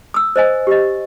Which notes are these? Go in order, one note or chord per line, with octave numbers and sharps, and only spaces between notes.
D#6 E6
C5 D#5 G#5
G4 D#5